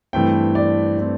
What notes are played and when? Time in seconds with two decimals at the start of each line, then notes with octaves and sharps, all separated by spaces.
0.13 G2 E3 A3 C4 G5
0.55 D5
0.97 E3 A3 C4